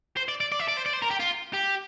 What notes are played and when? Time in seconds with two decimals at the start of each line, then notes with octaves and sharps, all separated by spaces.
0.17 C5
0.29 D5
0.41 D5
0.52 D5
0.60 E5
0.68 D5
0.77 C5
0.86 D5
0.93 C5
1.02 A#4
1.10 G4
1.20 F4
1.54 G4